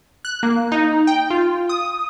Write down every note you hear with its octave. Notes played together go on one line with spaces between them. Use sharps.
F#6
A#3
D#4
G5
F4
D#6